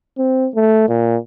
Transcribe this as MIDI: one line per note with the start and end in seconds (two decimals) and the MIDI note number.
0.18 0.48 60
0.55 0.87 57
0.89 1.16 46